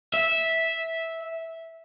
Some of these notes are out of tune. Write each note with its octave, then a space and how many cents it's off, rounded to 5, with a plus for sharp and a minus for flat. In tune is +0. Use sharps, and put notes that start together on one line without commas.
E5 -10